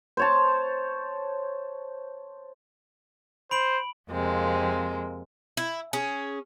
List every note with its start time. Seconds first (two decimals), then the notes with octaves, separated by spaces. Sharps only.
0.17 C5 C#5 A5
3.51 C5 B5 D7 F#7
4.10 F2 C3 G#3 A#3
5.57 E4
5.93 C#4 G#4